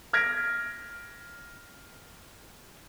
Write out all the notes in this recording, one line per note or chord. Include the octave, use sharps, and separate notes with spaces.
F6 G#6 A#6 B6 D7